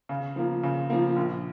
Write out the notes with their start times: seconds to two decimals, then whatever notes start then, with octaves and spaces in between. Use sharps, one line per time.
0.09 C#3
0.36 F3 A#3
0.63 C#3
0.90 F3 A#3
1.16 A#1